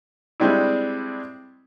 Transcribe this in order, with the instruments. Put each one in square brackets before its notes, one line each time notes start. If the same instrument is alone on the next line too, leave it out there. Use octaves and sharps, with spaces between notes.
[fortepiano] G3 G#3 C4 D4 E4